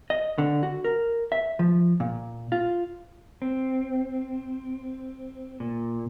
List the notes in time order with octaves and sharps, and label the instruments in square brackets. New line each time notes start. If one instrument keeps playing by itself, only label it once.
[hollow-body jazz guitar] D#5
D3
F#4
A#4
E5
F3
A#2
F4
[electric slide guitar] C4
A#2